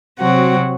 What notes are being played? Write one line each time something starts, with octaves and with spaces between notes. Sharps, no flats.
C3 F#3 C4 F#4